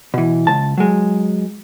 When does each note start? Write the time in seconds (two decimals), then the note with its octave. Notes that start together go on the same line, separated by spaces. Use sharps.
0.14 B2 E3
0.47 C#2 A5
0.78 F#3 G#3